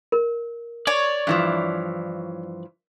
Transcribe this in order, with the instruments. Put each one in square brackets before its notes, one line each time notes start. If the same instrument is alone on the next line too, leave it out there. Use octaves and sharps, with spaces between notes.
[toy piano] A#4
[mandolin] C#5 [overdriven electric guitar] D5
[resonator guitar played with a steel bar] G2 E3 F3